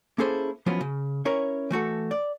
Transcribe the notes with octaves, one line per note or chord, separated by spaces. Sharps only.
A#3 C#4 E4 G#4 A4 C5
F3 F#3 B3 C#4 E4 F4
C#3
C#4 E4 A#4 C#5
E3 A3 F#4 A4
D5